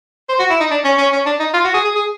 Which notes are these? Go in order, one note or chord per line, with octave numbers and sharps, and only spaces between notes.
C5
F#4
E4
D#4
D4
C#4
C#4
C#4
D4
D#4
F4
F#4
G#4
G#4
G#4